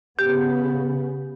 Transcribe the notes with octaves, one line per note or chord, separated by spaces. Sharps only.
C#3 B3 G4